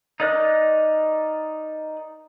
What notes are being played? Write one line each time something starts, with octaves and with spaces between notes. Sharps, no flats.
D#4 A#4 D5 D#5 F#6